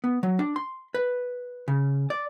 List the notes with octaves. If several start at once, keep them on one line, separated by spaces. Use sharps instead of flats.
B3
F#3
D4
C6
B4
C#3
D5